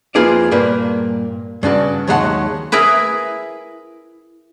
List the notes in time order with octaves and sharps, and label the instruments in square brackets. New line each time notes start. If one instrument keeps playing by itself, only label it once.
[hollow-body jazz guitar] F2 A#3 F4 G#4 B4 D5
G2 A#2 A#3 B4
G2 C#3 D4 F#4
D#2 F#3 G#3 F#4 F#5 A5
[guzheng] E4 G#4 A#4 B4